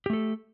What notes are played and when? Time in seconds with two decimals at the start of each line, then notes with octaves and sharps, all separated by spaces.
0.06 G4
0.10 A3
0.13 A4